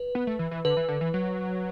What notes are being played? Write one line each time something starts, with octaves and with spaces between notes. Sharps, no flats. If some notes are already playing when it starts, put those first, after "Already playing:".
Already playing: B4
B3
A3
E3
E3
D3 B4
E3
D3
E3
F#3